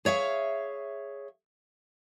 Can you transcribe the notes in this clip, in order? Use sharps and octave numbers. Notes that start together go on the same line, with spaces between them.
G#4 C#5 E5 F5